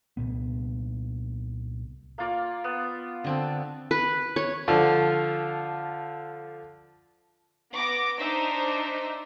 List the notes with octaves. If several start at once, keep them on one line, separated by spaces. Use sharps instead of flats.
C2 F2 A#2 B3
A#3 F4 D5
B3
D3 C4 A4
B4
C#5
D3 F3 F4
B3 D6 A#6
D4 D#4 C5 E5